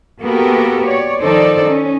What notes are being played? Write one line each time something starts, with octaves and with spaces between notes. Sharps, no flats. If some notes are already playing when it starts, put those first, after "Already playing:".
A#3 B3 F#4 G4 A4 A#4
C#5 D5
D#3 F3 D#4 A4 C5 D5
C#4 D#4